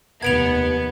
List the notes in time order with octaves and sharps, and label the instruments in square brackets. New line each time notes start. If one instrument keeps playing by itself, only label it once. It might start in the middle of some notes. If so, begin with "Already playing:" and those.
[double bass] F1 D#2 [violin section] B3 [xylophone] G#6 D7 F7